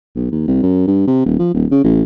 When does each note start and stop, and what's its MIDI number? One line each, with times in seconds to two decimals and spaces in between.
0.15 0.28 35
0.31 0.47 39
0.47 0.60 36
0.63 0.86 42
0.87 1.05 43
1.07 1.23 48
1.25 1.37 27
1.39 1.52 53
1.54 1.66 27
1.71 1.81 49
1.84 2.03 33